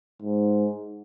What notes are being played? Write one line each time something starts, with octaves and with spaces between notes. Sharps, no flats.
G#2